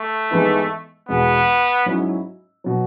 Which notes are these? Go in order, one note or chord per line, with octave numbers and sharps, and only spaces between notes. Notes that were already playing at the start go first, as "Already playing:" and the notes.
Already playing: A3
G#2 E3 G#3 B3 E4
E2 B2 G#3 B3
G#2 F#3 C#4 E4
B2 F#3